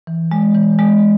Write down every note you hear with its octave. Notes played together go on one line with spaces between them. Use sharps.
E3
G#3
E3
G#3